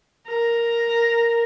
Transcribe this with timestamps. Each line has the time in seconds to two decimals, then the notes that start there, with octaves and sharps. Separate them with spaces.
0.28 A#4